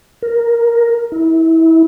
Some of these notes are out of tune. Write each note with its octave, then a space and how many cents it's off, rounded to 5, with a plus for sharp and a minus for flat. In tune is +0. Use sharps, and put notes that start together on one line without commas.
A#4 +5
E4 -25